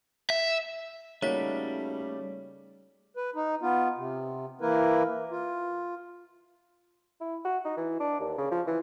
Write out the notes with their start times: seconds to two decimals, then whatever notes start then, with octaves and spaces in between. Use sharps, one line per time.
0.30 E5
1.22 C#3 G3 A3 A#3 D#4 F#4 C#5 B6
3.17 B4
3.35 D#4
3.62 B3 F4
3.97 C3
4.61 E3 A#3 E4 A#4 B4
5.31 F4
7.21 E4
7.45 F#4
7.65 D#4
7.77 E3
8.00 D4
8.20 D#2
8.38 C#3
8.51 F3
8.67 E3